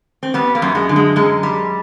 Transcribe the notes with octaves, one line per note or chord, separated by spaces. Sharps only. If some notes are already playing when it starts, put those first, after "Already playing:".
C4
G3 B3
A#3
F#2
G#3
D3
G#3
F#2 G#3
G3